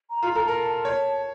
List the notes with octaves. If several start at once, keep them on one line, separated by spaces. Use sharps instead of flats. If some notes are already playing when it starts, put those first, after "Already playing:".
A#5
F4
A#5
A4
A#4 A5
A5
C#5